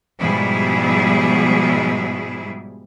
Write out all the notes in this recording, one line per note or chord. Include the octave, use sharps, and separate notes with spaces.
G#2 B2 F3 G3 E4 G#4